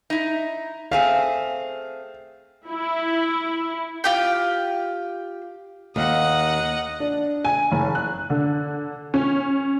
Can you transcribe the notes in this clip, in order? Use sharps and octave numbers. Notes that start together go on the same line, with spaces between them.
D#4 E4
A3 C4 G#4 F5
E4
F4 G4 G5
D#2 D#5 F#5
D4
G#5
F#1
F#6
D3
C#4